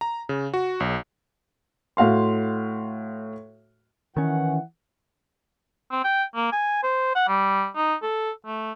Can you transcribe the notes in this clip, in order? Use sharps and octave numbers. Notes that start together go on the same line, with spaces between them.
A#5
C#3
F#4
B1
A2 F#4 F5 C6
D#3 E3 C#4 F#5
C4
G5
A#3
G#5
C5
F#5
G3
D#4
A4
A3